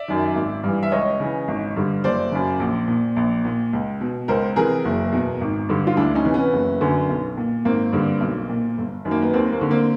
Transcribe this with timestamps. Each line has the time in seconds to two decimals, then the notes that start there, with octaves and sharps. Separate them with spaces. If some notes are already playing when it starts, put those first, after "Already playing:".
Already playing: D5 E5
0.08 F#2 D#3
0.35 G#1
0.63 G2 E3
0.83 E5
0.92 C#2 C#5 D#5
1.20 C#3 E3
1.48 G#1
1.76 G2 D3
2.04 F#1 C5 D5
2.32 F#2 C#3
2.60 A#1
2.88 A#2
3.16 A#1
3.45 A#2
3.73 C#2
4.01 B2
4.28 C#2 A#4 C5
4.56 C3 E3 G#4 A#4
4.85 F#1
5.12 E2 B2
5.41 G#1
5.69 G2 D3
5.87 F4
5.97 D2 D4 E4
6.15 C#4 D#4
6.25 C3 E3
6.34 B3 C#4
6.53 F#1
6.81 F#2 D3
7.09 B1
7.37 A#2
7.65 G#1 A#3 C4
7.93 G2 D3
8.21 B1
8.49 A#2
8.78 G1
9.05 F#2 D#3
9.11 A#3
9.22 B3
9.34 D#2 A#3 C4
9.52 A#3 C4
9.61 D3
9.71 A#3 C4